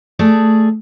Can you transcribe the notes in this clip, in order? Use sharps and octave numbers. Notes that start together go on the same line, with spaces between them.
A3 G#4 D5